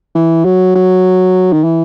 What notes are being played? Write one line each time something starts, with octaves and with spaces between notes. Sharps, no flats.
E3
F#3
F#3
D#3
E3